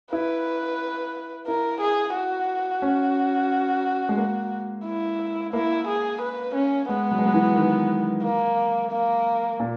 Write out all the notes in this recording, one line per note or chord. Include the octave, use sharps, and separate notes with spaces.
E4 B4
E4 A#4
G#4
F#4
C#4
G#3
A#3
E4
A#3 E4
G#4
B4
C#4
G#3 B3
F#3
G#3
F#3
E3
D#3
A#3
A#3
A#2